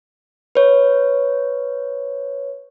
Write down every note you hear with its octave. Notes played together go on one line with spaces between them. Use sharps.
B4 C#5